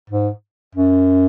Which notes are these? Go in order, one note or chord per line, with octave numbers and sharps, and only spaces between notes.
G#2
F#2